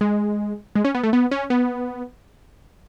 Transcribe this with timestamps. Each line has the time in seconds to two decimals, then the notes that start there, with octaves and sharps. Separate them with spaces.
0.01 G#3
0.75 G#3
0.85 C#4
0.95 B3
1.03 A3
1.13 B3
1.31 C#4
1.50 B3